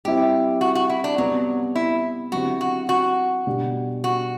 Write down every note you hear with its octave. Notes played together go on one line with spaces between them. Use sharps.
G3 C4 E4 G4
F#4
F#4
E4
D4
C3 F#3 G3 B3
E4
D3 F#3 C4 E4 F#4 G4
F#4
F#4
B2 G3 D4 G4
F#4